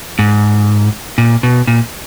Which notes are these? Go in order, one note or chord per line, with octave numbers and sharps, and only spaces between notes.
G#2
A#2
B2
A#2